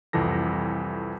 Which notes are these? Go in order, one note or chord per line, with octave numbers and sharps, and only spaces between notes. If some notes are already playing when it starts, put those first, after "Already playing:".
C2 F2 E3 A4 A#6